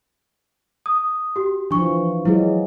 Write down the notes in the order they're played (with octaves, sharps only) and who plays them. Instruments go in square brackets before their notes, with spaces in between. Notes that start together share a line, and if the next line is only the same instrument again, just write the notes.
[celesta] D#6
F#4 G4
[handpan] E3 F3 [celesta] D4 C#6
[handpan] F#3 G#3 [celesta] E4 G#4